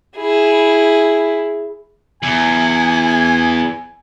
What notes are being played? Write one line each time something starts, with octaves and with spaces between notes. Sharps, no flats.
E4 G#4
E2 G#5